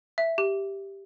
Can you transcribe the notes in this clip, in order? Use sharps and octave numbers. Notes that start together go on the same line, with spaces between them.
E5
G4